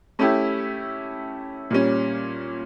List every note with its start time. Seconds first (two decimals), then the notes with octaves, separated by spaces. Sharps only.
0.19 A3 C#4 E4 G4
1.71 A#2 G3 C#4